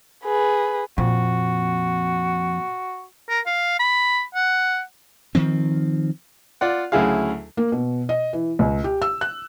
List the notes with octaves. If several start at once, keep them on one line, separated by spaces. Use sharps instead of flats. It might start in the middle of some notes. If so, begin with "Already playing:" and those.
G#4 B4
F2 A#2 F#4
A#4
F5
B5
F#5
D#3 F3 C4
F4 D5 F#5
D2 C#3 F#3 E4 G#4 F5
A#3
B2
D#5
E3
C#2
G4
E6
F#6